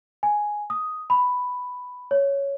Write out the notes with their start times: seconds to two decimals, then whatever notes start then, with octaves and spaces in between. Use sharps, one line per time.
0.23 G#5
0.70 D#6
1.10 B5
2.11 C#5